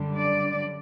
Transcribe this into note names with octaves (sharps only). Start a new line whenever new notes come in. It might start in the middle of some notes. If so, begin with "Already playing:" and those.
Already playing: F#2 D3 G3
D5